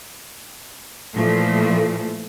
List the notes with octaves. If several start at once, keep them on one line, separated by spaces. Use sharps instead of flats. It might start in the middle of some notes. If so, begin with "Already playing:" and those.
A#2 E3 F3 A3 A#3